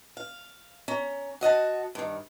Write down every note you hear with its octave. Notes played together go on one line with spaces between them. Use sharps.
F5
C#4 A#5
F#4 D#5 F#5 A5
G2 D#3